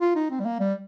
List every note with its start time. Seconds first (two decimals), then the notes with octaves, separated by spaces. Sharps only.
0.01 F4
0.15 D#4
0.30 C4
0.40 G3
0.45 A#3
0.60 G3